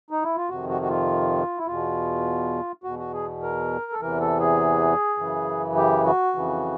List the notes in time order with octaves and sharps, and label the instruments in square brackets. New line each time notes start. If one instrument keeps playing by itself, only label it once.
[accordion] D#4
E4
F4
F2 C3 D#3 F#4
F#4
F#4
F4
E4
E2 B2 F4
E2 B2 F#4
F#4
G#4
A#4
A4
E2 C3 E3 A#4
A4
G#4
F#2 C#3 E3
G4
F#4
F2 C#3 E3